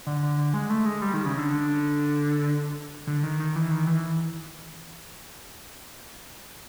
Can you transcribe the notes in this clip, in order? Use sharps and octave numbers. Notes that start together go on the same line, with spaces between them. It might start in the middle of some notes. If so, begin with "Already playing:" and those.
D3
D3
D3
G#3
A3
G#3
G3
D#3
C#3
D3
D3
D3
D#3
D#3
E3
D#3
E3